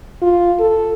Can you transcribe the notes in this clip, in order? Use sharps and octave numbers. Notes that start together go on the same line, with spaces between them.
F4
A4